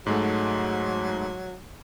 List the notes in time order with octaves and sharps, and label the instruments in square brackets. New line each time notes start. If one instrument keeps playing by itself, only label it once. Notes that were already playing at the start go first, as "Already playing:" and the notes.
[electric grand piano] G#2 G#3 A3 [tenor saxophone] F#3